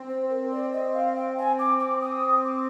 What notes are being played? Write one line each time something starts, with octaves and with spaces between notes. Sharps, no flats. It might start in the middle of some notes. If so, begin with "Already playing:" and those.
Already playing: C4
C5
A#4
D5
D#5
F5
G5
G#5
D6
D6
D#6
D6